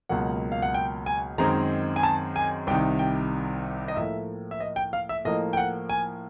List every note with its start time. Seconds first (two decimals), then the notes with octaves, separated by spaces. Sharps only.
0.09 C#2 B2 F#3 A#3 F#5
0.52 F5
0.62 F#5
0.74 G5
1.06 G#5
1.38 F#2 D#3 G#3 C4 A#5
1.96 G#5
2.03 A5
2.36 G#5
2.67 C2 C3 D#3 G5
2.99 G5
3.88 D#5
3.96 A2 F3 A#3 E5
4.51 E5
4.60 D#5
4.76 G5
4.93 F5
5.09 E5
5.25 A2 F3 A#3 D#5
5.53 G5
5.57 F#5
5.89 G#5